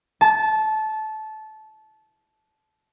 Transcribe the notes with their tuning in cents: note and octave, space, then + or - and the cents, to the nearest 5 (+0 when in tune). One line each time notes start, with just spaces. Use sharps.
A5 -20